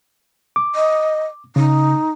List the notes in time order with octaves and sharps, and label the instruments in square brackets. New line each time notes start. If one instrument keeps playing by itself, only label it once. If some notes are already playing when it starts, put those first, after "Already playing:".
[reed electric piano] D6
[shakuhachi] D#5
[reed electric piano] C#3 [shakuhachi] D#4